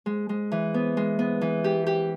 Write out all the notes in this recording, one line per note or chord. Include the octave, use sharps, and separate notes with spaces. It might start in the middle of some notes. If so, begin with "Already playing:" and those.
G#3
G#3
E3
B3
G#3
B3
E3
G4
G4